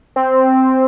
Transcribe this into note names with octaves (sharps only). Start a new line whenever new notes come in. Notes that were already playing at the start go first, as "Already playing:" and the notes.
C4